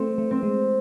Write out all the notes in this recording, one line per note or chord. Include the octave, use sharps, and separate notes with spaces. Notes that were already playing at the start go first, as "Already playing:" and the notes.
Already playing: A3 C4
A3
C4
G#3